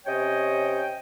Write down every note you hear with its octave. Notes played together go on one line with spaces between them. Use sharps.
C3 C#4 C#5 D#5 G5